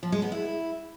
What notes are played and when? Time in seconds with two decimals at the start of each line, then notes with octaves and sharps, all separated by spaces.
0.03 F3
0.12 G#3
0.22 B3
0.32 E4